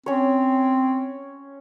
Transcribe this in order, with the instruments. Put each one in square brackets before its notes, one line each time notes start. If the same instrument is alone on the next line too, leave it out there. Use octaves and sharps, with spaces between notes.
[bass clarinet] C4 [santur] C#4 C#5